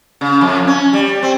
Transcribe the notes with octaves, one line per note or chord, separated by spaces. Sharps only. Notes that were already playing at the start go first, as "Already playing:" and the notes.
C#3
F2
C#4
G3
C4